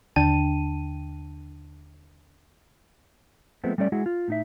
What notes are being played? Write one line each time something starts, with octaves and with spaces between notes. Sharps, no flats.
D#2 D3 D4 G5 A5 D#7
F3 G#3 A3 B3 C4
G3 A3 C#4 D5
G#3 E4 F#4 G#4
F4
A2 D#4 E5